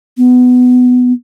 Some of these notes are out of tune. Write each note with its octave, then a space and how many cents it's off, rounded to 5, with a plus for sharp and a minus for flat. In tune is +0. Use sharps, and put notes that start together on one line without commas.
B3 +15